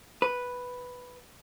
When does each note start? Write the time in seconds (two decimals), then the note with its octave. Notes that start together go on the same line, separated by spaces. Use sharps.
0.22 B4